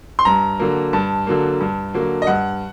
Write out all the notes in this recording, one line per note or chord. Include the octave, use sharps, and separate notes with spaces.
C6
G2 A#5
D3 F#3 A#3
G2 A5
D3 F#3 A#3
G2
D3 F#3 A#3
D#5
G2 F#5